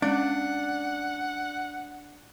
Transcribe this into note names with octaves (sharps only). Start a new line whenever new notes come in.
G#3 C#4 D4 F5 F#5